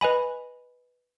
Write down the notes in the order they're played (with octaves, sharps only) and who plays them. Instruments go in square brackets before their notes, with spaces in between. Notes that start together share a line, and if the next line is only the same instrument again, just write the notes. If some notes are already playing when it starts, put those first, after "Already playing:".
[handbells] B4 D#5 G#5 B5